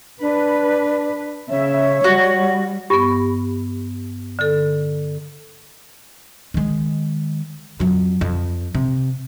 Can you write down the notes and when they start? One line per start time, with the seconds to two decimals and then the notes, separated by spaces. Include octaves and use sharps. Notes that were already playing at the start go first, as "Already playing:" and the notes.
0.21 D4 B4
1.50 C#3 C#5 E5
2.04 G3 F#4
2.90 G2 B3 G4
4.39 D3 A4
6.54 D#3 G#3
7.80 F2 F#3
8.21 F2
8.75 C3